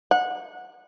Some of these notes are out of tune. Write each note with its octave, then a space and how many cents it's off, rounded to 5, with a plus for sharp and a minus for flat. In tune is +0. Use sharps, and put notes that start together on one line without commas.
F#5 -20